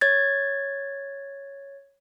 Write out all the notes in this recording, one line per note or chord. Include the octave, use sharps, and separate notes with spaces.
C#5 G#6 A6